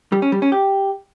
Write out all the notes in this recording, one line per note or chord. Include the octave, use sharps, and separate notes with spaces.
G3
C#4
G3
C#4
G4